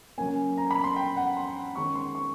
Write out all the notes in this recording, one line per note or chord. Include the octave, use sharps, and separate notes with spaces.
C#3 F#3 A#3 C#4 G#5
A#5
B5
C6
G5
F#5
C6
D#3 G#3 C#4 C#6
C6
C#6